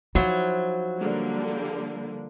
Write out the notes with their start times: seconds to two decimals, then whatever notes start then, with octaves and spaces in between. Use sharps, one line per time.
0.15 F3 F#3 D#4 E4 C5
0.99 D3 G3 A#3